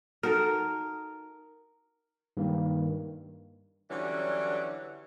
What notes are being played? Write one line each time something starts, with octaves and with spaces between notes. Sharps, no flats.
D#4 F#4 A4 A#4
G2 D#3 A#3
D3 E3 F#3 G3 C#4